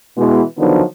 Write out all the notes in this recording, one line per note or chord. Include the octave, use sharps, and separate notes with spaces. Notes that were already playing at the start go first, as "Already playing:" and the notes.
B2 E3 G#3
D3 D#3 F3 F#3 B3 D#4